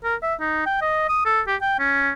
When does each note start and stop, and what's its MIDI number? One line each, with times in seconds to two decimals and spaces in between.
0.04 0.15 70
0.23 0.34 76
0.40 0.63 63
0.66 0.79 79
0.81 1.04 75
1.09 1.21 87
1.25 1.41 69
1.48 1.56 67
1.61 1.75 79
1.79 2.11 61